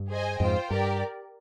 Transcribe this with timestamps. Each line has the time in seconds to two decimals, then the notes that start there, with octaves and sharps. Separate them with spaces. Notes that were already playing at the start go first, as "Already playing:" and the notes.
Already playing: G2
0.10 G#4 C5 D#5 G#5
0.40 F2 G#2 F4 C5 G5
0.70 G2 G4 A#4 D5